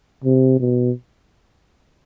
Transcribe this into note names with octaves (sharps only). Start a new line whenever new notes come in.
C3
B2